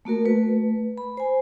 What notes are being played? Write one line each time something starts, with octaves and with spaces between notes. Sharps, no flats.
A3 A#3 F#4 A#4
A3 B4
B5
C5 G#5